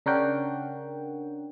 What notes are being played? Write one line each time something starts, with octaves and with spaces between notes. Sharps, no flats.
C#3 D4 A#4 C#5 F#5 G5